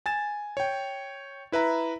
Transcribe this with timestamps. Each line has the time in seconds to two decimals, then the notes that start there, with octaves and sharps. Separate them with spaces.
0.06 G#5 A6 E7
0.57 C#5 G5
1.52 E4 B4 E5 A#5